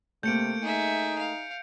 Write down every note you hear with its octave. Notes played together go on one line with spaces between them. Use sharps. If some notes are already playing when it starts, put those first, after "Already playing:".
C3 A3 A#3 G6 C#7 D7
D#4 G#4 E5
F5